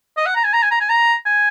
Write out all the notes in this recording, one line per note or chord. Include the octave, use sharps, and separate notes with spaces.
D#5
F#5
A#5
G#5
A#5
G#5
A#5
G#5
A#5
G#5